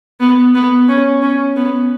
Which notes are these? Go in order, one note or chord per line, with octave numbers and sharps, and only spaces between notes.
B3
B3
C#4
C#4
B3